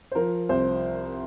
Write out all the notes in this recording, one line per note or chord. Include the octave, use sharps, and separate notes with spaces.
C5
F3 A#4
C2 C5